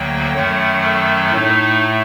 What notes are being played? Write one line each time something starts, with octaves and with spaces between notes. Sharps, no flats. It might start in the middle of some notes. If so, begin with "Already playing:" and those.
Already playing: D2 D3 F#3 A#3 G5
F#2 D#3 F#3 A3 F#5
A4
A2 A3 D#4